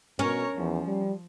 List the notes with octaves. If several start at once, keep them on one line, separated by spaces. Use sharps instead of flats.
B2 C#4 A#4 C#5 A#5
E2 F3
G3